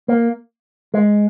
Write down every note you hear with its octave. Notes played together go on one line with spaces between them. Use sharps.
A#3
G#3